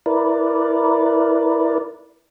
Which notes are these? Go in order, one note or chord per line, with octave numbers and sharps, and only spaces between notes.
E4 A#4 B4 D5